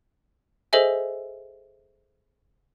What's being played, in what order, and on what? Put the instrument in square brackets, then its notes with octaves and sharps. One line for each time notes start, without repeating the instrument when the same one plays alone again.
[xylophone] G#4 A4 C5 D#5 E5 G#5